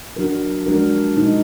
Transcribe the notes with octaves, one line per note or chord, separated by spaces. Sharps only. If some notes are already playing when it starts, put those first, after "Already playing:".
F#3 D4 F#4 A#4
F3 G#3 D4 F#4 A#4
B2 G#3 D#4